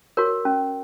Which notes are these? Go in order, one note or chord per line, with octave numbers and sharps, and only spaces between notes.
F#4 A#4 C#5
C#4